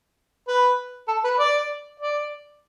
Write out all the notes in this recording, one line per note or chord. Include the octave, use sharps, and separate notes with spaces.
B4
A4
B4
D5
D5